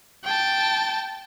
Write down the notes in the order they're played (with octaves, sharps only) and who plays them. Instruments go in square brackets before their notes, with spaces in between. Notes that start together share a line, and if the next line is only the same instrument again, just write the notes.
[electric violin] G5 A5